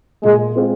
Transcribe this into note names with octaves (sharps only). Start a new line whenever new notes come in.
A#2 G#3
G#3 C4 F4